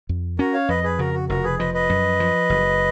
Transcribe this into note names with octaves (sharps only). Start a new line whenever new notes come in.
F2
C#4 F#4 A#4
C#5 F5
F2 B4 D#5
G#4 B4
C#3 F#4 A#4
F#4
F1 F#4 A#4
G#4 B4
F3 B4 D#5
B4 D#5
F#2
F3
F#1